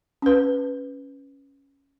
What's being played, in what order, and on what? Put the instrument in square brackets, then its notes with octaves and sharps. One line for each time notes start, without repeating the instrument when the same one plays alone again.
[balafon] C#4 B4